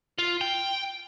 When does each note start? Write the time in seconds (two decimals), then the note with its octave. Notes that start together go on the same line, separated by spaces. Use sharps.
0.18 F4
0.41 G5